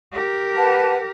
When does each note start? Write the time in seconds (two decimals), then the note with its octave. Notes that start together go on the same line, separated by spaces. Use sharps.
0.12 G4 A#4
0.55 B4 F#5 A5